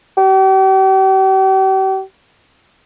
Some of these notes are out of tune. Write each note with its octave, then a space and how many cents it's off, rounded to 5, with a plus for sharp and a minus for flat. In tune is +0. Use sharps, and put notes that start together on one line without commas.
G4 -40